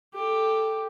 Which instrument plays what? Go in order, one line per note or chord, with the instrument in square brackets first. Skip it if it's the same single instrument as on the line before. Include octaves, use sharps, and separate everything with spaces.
[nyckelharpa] G4 A4